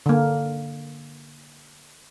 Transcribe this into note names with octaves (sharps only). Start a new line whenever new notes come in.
D3 A#3